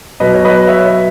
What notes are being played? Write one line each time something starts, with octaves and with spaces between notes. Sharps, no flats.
B2 F#3 B4 D#5
C#5
B4 D#5
C#5 E5